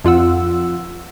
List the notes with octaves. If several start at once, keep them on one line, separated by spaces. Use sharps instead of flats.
F2 F4 F#5 E6